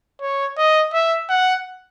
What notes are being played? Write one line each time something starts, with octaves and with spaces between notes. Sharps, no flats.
C#5
D#5
E5
F#5